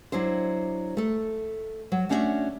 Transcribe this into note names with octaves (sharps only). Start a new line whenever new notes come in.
F#3 D4 E4 C5
A3 A4
F#3
A3 C#4 D4 F#4 C5 E5